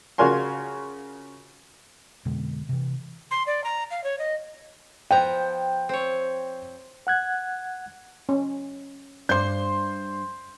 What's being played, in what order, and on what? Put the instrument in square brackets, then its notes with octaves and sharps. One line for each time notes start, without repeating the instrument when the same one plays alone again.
[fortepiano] C#3 F4 F#4 A#4 G#5 C6
[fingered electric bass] F2 B2 D3 G#3
C3 E3
[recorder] C6
D5
A#5
F5
C#5
D#5
[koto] F3 B3 A#5 [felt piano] G5
[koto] C4 C#5
[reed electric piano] F#5 F#6 G#6
[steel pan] C#4
[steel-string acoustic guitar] G2 C5 [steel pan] D5 [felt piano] C6 G6